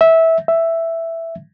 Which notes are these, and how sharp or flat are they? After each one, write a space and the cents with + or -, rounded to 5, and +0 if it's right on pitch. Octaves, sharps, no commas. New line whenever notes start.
E5 -15
E5 +5